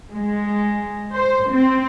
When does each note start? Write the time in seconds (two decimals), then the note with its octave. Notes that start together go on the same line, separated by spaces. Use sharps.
0.12 G#3
1.13 C5
1.51 C4